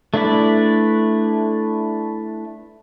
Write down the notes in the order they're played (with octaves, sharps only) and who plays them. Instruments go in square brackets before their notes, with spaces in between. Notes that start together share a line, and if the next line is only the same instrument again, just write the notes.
[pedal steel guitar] A3 D4 E4 B4 D5